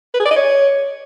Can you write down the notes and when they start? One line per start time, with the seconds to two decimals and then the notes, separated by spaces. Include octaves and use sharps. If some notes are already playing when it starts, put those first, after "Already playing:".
0.14 B4
0.20 G#4
0.25 D5
0.31 D#5
0.36 C#5